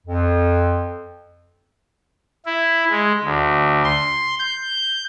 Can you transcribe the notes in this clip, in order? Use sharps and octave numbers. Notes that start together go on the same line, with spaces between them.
F2
E4
G#3
D2
C6
G6